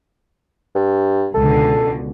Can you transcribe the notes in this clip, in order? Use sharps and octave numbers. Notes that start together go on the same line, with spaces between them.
G2
C#2 B2 D3 A4